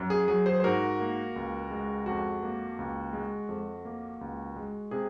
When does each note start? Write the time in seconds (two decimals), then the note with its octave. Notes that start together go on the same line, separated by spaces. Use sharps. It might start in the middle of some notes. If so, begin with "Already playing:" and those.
Already playing: F#2
0.10 G#4
0.28 F#3 G#4
0.46 G#4 C5
0.60 C5
0.64 G#2 F#4 A#4
1.00 A#3
1.36 C#2
1.71 G#3
2.06 F2 F#4
2.43 A#3
2.79 C#2
3.13 G#3
3.49 F2
3.85 A#3
4.21 C#2
4.56 G#3
4.91 C3 G#4